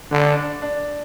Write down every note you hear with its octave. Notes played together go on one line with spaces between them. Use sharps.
D3 D4
D4
D4